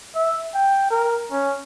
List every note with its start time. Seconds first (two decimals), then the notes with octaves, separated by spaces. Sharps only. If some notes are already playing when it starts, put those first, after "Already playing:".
0.15 E5
0.54 G5
0.90 A#4
1.31 C#4